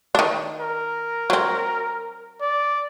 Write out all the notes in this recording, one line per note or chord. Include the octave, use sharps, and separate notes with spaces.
D#3 D4
A#4
F#3 C4
D5